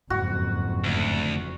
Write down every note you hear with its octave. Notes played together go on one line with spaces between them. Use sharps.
F#1 F2 G#2 F#4
D2